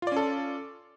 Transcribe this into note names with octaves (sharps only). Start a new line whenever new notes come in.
C#4 F4 A4 D5